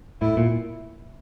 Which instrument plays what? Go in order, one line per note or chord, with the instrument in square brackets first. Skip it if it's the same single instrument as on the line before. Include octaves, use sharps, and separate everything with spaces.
[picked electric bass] A2 [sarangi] E4
[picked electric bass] A#2